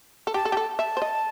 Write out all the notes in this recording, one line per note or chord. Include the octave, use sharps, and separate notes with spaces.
A4
G4 A5
A4
G4
A4
E5 A5
C5
D#5